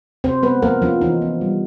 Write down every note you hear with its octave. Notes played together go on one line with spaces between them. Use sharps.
C3 C4 C5
G#3 B3 B4
F3 A#3 A#4
F3 C#4 F4
E3 D#4
B3
G3